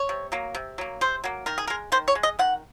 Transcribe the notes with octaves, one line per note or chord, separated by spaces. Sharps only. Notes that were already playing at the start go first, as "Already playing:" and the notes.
Already playing: C#5
C3
F#3 A#3
C3
F#3 A#3
C3 C5
F#3 A#3
D#3 A#4
G#4
A#4
G#3
D#3 C5
C#5
G#3
D#5
D#3 F#5